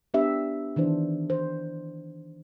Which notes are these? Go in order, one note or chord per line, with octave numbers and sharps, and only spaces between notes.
B3 D4 G4 E5
D#3 E3 D4 C5
C5